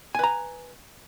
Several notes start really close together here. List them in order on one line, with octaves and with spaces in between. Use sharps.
G#5 B4 A#5